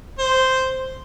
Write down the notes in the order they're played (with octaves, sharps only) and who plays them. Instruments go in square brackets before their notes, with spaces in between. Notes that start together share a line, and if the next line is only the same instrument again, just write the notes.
[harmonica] C5